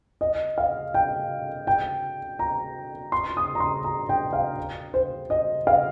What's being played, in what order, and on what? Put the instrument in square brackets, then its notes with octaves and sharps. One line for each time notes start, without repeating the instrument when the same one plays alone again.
[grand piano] D#5
F5
G5
G5
A#5
C6
D#6
A#5
C6
A#5
G5
F5
C5
D#5
F5